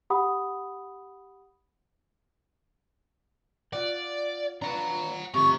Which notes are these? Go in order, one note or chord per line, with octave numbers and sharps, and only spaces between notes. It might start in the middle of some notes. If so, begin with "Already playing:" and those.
G4 F#5 B5 D#6
F4 D5 F#5
D4 F4 B4 F#5 A#5
C3 F3 A3 G4 A#5 C#6